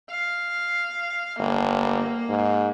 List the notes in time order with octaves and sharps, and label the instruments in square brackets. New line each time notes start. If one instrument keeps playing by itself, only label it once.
[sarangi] F5
[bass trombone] G1 [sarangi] A#3
[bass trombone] G#2